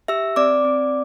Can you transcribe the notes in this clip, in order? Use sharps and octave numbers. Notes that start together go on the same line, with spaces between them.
G4 E5 E6
C4 D5 D6
C4